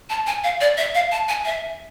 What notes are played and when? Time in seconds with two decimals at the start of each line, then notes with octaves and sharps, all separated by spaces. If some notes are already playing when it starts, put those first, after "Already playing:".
0.10 A5
0.27 G#5
0.44 F5
0.61 D5
0.78 E5
0.95 F5
1.11 A5
1.29 G#5
1.45 E5